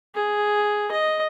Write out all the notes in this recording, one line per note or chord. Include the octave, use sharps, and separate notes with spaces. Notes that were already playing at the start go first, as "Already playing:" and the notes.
G#4
D#5